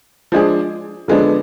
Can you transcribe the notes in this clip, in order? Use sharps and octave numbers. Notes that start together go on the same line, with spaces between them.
F3 G#3 D4 G#4
D3 F3 G#3 B3 D4